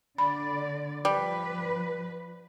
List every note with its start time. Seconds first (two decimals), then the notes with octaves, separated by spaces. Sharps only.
0.18 D3 D5 B5
1.05 F3 G3 B4